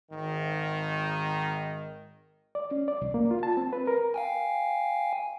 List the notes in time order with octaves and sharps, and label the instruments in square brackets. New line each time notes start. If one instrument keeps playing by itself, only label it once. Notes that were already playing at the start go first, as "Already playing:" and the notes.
[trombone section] G#1 D#3
[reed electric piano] D5
C#4
D5
C2
A#3
F4
A5
C4
B4
A#4
[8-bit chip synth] F5 G5 G#5